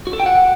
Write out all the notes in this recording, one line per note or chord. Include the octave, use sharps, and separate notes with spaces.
F#4
A4
G5
F#5